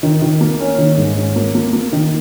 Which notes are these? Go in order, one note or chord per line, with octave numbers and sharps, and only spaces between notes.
D#3
D#3
A#3
C#4
D#3
G#2
C#4
A#3
A#3
A#3
D#3